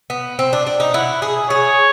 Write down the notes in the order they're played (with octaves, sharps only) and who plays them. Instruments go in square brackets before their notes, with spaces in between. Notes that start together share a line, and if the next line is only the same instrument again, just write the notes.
[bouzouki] B3
C4
D4
D4
D#4
[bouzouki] E4 [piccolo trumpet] F#5
[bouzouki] G#4
[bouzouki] G#4 [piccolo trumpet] C#5